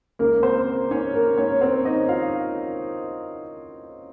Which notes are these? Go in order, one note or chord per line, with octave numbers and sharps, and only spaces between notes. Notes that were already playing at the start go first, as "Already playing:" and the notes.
C#2 C#3 A#3 A#4
C4 C5
C#4 C#5
A#3 A#4
C#4 C#5
C4 C5
D#4 D#5
F4 F5